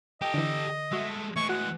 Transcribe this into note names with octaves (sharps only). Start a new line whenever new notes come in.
G4 A4 D#5 G5
D3 E3 D4
G#3 A3 F#4 E5
E3 G#3 A3 C#6
F#4 F#5